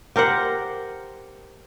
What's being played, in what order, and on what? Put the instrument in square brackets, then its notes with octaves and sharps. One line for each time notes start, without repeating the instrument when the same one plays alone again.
[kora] G4 A#4 C5 F#5